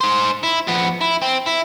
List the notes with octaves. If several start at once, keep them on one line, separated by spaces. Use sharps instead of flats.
D#4 C5
E4
F2 B3
E4
C4
E4